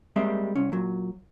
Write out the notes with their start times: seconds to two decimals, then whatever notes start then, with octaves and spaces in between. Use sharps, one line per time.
0.16 G3 G#3 A#3 C4 E5
0.55 C2 C#4
0.72 A#2 F#3